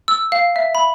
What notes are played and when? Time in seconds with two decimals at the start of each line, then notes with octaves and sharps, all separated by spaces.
0.08 E6
0.32 F5
0.56 E5
0.75 B5